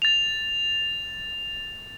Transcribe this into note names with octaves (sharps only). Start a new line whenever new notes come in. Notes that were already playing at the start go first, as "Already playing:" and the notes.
A6 F7